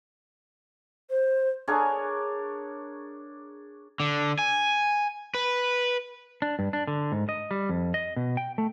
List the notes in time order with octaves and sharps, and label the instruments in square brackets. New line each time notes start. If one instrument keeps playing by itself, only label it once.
[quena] C5
[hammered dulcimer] D4 G#4 A#4 C#5
[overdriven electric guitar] D3
G#5
B4
[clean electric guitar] D4
G2
D4
D3
G#2
D#5
G3
F2
D#5
B2
G5
A3